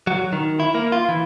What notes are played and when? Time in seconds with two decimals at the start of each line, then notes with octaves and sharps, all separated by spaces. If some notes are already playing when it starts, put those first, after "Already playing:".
0.07 F#3
0.33 D#3
0.60 E4
0.75 A#3
0.92 F4
1.09 E3